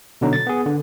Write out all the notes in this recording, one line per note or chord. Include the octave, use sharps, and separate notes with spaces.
B2 D3 F#3 D#4
A6
B3 G#4
D3